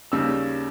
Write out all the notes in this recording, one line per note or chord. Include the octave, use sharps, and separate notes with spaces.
D#2 C#3 G3 E6